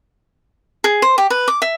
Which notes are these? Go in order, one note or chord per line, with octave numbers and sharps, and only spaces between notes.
G#4
C5
G4
B4
D6
E5